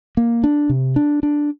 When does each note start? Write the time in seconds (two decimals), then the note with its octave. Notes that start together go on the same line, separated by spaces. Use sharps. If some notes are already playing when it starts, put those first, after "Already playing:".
0.17 A#3
0.44 D4
0.69 C3
0.96 D4
1.23 D4